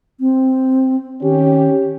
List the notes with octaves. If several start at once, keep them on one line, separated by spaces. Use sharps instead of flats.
C4
D#3 C#4 G4